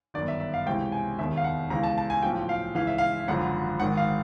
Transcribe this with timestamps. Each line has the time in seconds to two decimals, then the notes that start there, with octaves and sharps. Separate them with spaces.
0.14 G1 F#2 D#3 D5
0.28 E5
0.40 E5
0.54 F5
0.66 C#2 C3 E3 G5
0.92 G#5
1.19 E1 D#2 D#3 E5
1.37 F5
1.44 F#5
1.70 C#2 C#3 E3 A#5
1.83 A5
1.98 A5
2.10 G#5
2.23 B1 A2 F3 G5
2.49 F5
2.75 C#2 C#3 E3 F5
2.87 E5
2.98 F5
3.28 G#1 F#2 D3 F3 F#5
3.80 G#1 G#2 D#3 F#5
3.97 F5